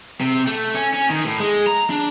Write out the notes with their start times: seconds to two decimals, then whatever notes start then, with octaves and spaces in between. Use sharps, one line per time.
0.21 C3
0.47 A3
0.75 C#4
0.94 C#4
1.10 D#3
1.26 A2
1.40 G#3
1.67 A#5
1.90 D4